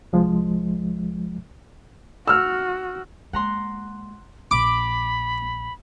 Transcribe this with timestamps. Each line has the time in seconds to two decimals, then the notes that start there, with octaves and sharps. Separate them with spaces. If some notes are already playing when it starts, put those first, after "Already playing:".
0.13 C2 F3 G#3
2.27 F#4 E6 F6
3.33 G#3 A#3 F#5 A#5 C6
4.51 A#1 B5 D6